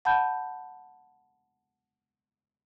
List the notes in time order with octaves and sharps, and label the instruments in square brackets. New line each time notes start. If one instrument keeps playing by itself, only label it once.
[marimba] F#5 A5 B5 G6